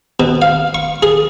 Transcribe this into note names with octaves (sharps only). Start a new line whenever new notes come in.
B2
F5
C#6
G#4